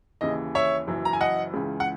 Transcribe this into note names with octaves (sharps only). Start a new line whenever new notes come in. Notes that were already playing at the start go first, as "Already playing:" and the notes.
D#2 C#3 E3 D#5
C#5 E5
F#1 F#2 E3
A#5
G#5
D#5 F#5
C#2 C#3 E3
F#5